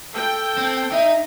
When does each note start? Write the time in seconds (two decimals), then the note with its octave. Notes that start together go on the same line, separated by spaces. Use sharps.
0.14 A4 G5
0.58 C4
0.92 D#4 E5